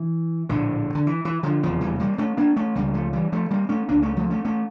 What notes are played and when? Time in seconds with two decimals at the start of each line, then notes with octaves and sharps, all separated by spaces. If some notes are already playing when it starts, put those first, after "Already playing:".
Already playing: E3
0.49 A#1 A2 D3
0.95 D3
1.07 E3
1.25 E3
1.43 D3 F3
1.63 F1 E2 C#3 F3
1.81 E3 G3
2.00 G3 A#3
2.18 A3 C#4
2.37 A#3 D4
2.56 A3 C#4
2.75 C#2 C#3 G3 A#3
2.94 F3 A3
3.13 E3 G3
3.32 F3 A3
3.51 G3 A#3
3.69 A3 C#4
3.88 C#2 C#3 A#3 D4
4.02 A3 C#4
4.17 F3 A3
4.30 A3 C#4
4.45 A3 C#4